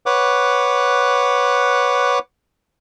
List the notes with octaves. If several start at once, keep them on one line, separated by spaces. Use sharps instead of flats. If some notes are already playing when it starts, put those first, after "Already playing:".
B4 C#5 F#5 D6